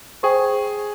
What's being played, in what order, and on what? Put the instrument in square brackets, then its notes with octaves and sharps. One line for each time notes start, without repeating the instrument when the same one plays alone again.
[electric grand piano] G#4 [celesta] C5 G5 C#6